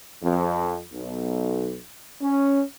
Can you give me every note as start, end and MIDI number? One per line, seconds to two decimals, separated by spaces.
0.22 0.80 41
0.92 1.77 35
2.21 2.61 61